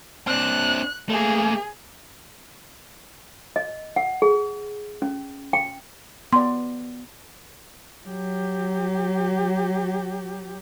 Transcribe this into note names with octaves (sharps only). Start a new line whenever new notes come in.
C4 D4 F#6
A3 A#3 G#4
D#5
F#5
G#4
C#4
G5
B3 D5 C6
F#3 G4